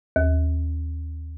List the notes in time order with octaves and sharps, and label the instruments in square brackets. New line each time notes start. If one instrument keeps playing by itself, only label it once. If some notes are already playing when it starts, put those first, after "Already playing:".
[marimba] D#2